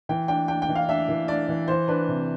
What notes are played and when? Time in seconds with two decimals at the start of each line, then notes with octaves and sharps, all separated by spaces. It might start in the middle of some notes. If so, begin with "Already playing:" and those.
0.09 E3 G5
0.28 D4 G5
0.48 D4 G5
0.62 G5
0.69 E3
0.75 F5
0.89 D4 E5
1.09 E3
1.28 D4 D5
1.49 E3
1.68 E3 C5
1.88 D4 B4
2.08 C3